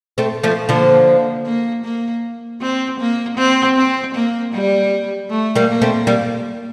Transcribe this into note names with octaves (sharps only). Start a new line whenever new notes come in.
A3 C4
F3 A3
D3 F3 A#3
A#3
A#3
C4
A#3
C4
C4
A#3
G3
A3
G3 A#3
A#3
A3 C4
G3 A#3